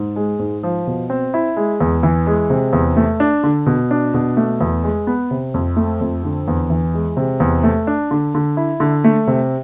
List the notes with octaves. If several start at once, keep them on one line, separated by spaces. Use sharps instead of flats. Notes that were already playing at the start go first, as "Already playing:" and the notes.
Already playing: G#2
G#3
G#2
F3
B2
C4
E4
G#3
E2
E3
G#3
C3
E2
A3
D4
D3
B2
D4
B2
A3
E2
G#3
B3
C3
F2
A3
F2
D3
E2
E3
G#3
C3
E2
A3
D4
D3
D3
E4
D3
A3
C3